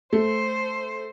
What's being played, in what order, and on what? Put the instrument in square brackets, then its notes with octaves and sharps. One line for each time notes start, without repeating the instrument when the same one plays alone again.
[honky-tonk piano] A3 [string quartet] C5